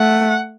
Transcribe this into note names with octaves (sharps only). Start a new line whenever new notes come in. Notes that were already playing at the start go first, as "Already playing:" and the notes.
Already playing: A3 F#5